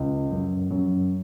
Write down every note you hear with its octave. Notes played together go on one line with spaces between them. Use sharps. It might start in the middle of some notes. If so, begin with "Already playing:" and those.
Already playing: C#2
F#2
F#2